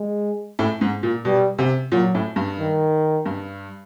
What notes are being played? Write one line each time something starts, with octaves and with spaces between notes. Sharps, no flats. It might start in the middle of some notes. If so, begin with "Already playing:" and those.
Already playing: G#3
A2
G#2
A#2
B2 G3
C3
A#2 F#3
A2
G2
D#3
G2